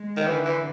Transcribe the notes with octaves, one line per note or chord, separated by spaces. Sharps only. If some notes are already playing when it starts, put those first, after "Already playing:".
Already playing: G#3
D#3
D3 E3
E3